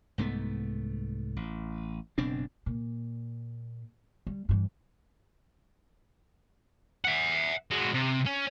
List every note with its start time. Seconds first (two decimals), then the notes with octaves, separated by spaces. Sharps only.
0.18 C2 G#2 A3 B3
1.36 A1
2.18 F#1 B2 C4 D4
2.66 A#2
4.27 G3
4.49 G2 E3
7.05 E5 F#5
7.71 G#3 F#4
7.94 C3
8.26 C#4